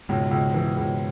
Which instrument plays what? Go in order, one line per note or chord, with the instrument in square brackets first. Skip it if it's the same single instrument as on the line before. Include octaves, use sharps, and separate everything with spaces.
[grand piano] C#2 [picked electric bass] G#2 B2
[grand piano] C#2
E3
C#2